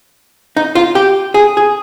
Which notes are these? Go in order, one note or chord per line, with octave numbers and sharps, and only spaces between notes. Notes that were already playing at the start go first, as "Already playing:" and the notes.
D#4
F4
G4
G#4
G#4